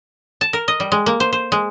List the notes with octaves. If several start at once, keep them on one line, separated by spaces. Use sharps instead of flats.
A5
A#4
D#5
G3
G#3
A#3
C5
C5
G#3